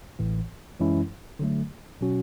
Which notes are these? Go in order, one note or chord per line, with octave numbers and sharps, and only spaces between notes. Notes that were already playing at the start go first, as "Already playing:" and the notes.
A1 A2 E3
F#2 E3 G#3 C#4 E4
D3 F#3 A3
B2 F#3 C#4 F#4